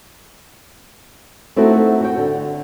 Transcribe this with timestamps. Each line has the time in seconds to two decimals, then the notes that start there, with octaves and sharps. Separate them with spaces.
1.56 A3 C4 D#4 E4 F#4 A4
2.01 F#4 G5
2.18 D3